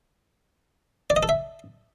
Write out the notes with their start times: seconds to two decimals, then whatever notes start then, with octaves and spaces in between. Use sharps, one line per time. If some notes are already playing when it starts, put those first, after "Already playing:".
1.10 D5
1.16 D#5
1.23 A4
1.29 E5